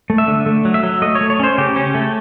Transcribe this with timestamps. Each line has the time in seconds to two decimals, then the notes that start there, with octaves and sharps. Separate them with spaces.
0.10 A3
0.18 E5
0.28 D3
0.46 A3
0.65 F#3
0.74 E5
0.83 F#3
1.02 A3 D#5
1.15 C#5
1.21 A3
1.30 C#5
1.39 C#4 C5
1.58 C#3 G4
1.76 C#4
1.94 A3